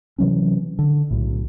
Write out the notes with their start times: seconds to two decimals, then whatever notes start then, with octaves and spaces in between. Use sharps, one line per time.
0.18 C3 E3 F#3 C#4
0.79 D3
1.11 B1 A2